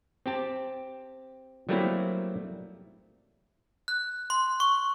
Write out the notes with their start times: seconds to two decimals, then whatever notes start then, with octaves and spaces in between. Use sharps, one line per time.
0.26 C4 G4 A5
1.69 F#3 G3 A3 A#3 C4 E4
3.88 F#6
4.30 C6
4.60 C#6